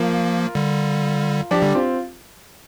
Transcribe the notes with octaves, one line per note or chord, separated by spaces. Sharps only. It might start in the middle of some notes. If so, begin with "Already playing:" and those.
Already playing: F3 A#3 F4 A#4
D3 G3
F3 D4 G4
D3 G3
C4 F4